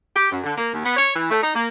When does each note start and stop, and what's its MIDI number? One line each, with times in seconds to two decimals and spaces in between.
0.16 0.30 67
0.32 0.39 42
0.44 0.53 50
0.58 0.72 58
0.73 0.84 39
0.85 0.93 59
0.96 1.14 73
1.15 1.29 52
1.30 1.41 57
1.42 1.52 63
1.55 1.68 58